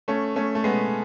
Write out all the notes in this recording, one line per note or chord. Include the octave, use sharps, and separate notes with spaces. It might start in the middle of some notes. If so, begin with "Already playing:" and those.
A3 C#4
A3 C#4
A3
G#3 B3